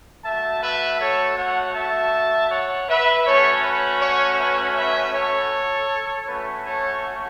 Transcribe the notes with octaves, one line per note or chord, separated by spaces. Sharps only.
A3 F#4 E5 A5
B4 E5
A4 C#5
C#5 F#5
E5 A5
C#5 F#5
B4 E5
A3 C#4 F#4 A4 C#5
B4
C#5 F#5
B4 E5
B4 E5
A4 C#5
A3 C#4 F#4 B4
A4 C#5